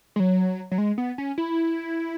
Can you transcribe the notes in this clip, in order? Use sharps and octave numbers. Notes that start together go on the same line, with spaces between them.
G#3
F#3
F#3
G#3
B3
C#4
E4